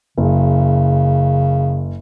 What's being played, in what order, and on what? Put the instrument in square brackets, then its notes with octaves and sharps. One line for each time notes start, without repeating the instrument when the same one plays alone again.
[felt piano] F#1 [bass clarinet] C#3